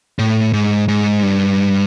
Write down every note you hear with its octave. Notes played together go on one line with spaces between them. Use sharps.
A2
G#2
G#2
G2